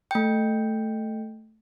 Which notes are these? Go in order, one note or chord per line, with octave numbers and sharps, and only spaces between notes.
A3 G5